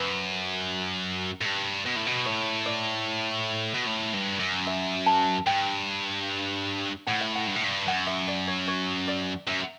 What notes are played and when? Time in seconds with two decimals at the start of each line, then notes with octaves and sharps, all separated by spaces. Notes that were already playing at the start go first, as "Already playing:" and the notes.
Already playing: F#2 B4
1.41 A2
1.45 G2
1.86 B2
1.96 A2
2.06 B2
2.26 A2 C#5
2.66 D5
3.75 B2
3.87 A2
4.14 G2
4.40 F#2
4.67 E5
5.06 A5
5.47 G2 G5
7.07 A2 F#5
7.21 E5
7.36 F#5
7.47 G2
7.56 A2
7.64 G2
7.87 F#2 F#5
8.07 E5
8.28 D5
8.47 C#5
8.68 C#5
9.08 D5
9.47 F#2 E5